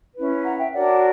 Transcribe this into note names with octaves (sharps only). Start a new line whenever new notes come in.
C#4 E4 B4
F#5 A#5
E5 G5
D4 F#4 A#4 C#5 D5 F#5